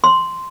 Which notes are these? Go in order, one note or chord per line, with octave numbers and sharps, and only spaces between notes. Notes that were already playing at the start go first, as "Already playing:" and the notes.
C6